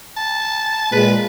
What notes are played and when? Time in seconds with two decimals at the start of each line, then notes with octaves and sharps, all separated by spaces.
0.16 A5
0.92 A#2 G#3 B4